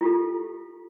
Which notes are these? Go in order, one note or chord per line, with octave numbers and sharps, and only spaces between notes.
E4 F4 G4 A4